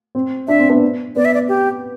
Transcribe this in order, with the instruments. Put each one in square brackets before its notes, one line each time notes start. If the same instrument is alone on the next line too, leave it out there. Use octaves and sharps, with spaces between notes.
[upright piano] C4
[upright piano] D4 [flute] E5
[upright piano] C4
B3 D4
[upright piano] B3 [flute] D5
[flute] E5
D5
G4